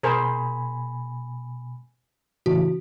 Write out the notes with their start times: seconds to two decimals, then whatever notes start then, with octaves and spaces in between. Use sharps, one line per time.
0.03 B2 G#4 A#4 C5 G#5 B5
2.46 A2 C#3 E3 F#4